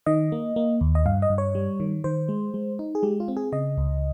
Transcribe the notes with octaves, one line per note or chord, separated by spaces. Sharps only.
D#3 D#5
A#3
A#3
D#2
D#5
G2 F5
D#5
G2
C#5
G3
D#3
D#3 C5
G#3
G#3
D#4
G#4
G#3 G4
F4
C4
G#4
C#3 D#5
C#2